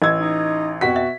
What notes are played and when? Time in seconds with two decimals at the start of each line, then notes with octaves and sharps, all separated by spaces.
0.02 A1 D#5 E6 G#6
0.18 D#4
0.81 F2 B2 F#4 B6
0.96 E5